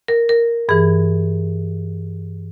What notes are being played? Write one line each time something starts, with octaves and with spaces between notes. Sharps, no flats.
A#4
A#4
G2 E3 G#4